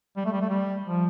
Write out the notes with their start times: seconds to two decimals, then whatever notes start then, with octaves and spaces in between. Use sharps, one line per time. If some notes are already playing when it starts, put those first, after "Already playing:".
0.17 G3
0.25 A3
0.32 G3
0.41 A3
0.49 G3
0.85 F3